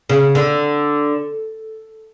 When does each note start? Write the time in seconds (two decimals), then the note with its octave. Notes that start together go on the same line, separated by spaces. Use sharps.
0.10 C#3
0.35 D3